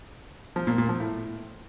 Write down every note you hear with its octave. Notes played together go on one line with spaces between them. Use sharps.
F3
A#2
A#2
F3
A2